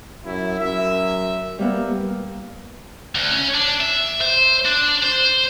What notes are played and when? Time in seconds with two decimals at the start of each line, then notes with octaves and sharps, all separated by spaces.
0.25 F#2 E4
0.59 F#2 A#4 E5
1.59 G3 A#3 B3
3.15 D2
3.31 C#4
3.54 D4
3.81 E5
4.21 C5
4.65 D4
5.03 C5